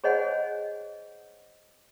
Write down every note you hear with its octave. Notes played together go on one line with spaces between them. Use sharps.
G#4 C5 C#5 D#5 F#5 G#5